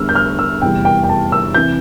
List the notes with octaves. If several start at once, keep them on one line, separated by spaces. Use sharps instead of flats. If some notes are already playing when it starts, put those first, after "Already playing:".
Already playing: E2 D3 G3 E6 F6
G6
F6
E6
F1 E2 E3 G3 G5
G5
G5
A5
E6
C3 E3 G6